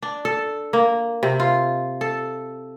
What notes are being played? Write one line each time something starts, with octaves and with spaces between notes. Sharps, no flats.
D4
A4
A#3
C3
F4
A4